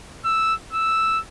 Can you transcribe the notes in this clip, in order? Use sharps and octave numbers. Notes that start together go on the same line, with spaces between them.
E6
E6